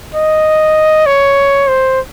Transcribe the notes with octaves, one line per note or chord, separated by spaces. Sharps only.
D#5
C#5
C5